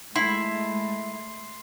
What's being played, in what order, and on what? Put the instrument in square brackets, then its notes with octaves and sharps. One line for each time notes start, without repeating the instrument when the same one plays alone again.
[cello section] G#3 A3 [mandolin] E4 [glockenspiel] C6 C7